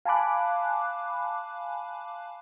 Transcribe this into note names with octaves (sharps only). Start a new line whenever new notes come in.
F5 G#5 A5 B5 D6 F#6